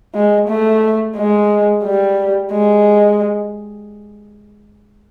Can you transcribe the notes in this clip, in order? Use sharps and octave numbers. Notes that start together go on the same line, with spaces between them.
G#3
A3
G#3
G3
G#3